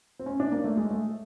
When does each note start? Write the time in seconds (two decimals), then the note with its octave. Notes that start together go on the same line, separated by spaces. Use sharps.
0.19 C4
0.26 C#4
0.40 D4
0.52 A#3
0.64 A3
0.77 G#3
0.91 A3